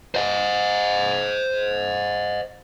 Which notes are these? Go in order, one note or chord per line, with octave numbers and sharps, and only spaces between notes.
C5 D#5